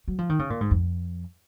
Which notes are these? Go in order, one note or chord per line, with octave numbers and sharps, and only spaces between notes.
F#3
F3
D#3
C#3
A#2
G#2
F2